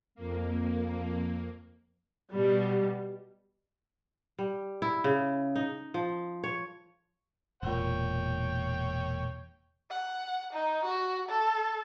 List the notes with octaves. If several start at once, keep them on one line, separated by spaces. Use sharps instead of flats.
F2 A#3
B2 G3
G3
E4
C#3
D#4
F3
C#5
E1 A#2 C#5 G5
F#5
D#4
F#4
A4